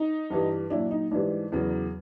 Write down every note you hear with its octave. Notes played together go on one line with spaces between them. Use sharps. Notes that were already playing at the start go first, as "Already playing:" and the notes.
Already playing: D#4
G2 E3 G3
A#2 F#3 D4 E4
D#4
G#2 E3 G3 D4
E2 C#3 F#3